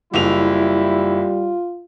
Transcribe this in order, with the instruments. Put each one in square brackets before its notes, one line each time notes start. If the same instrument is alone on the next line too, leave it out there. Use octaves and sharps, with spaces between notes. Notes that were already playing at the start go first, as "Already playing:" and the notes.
[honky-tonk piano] F#1 F7 [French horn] G3 [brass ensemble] E4 [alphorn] F4